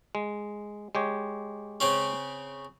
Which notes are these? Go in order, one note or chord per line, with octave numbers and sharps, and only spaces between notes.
G#3
G#3 G4 C#5
C#3 C4 C#4